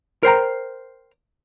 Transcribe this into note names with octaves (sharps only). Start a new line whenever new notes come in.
A#4 C5 G5 A#5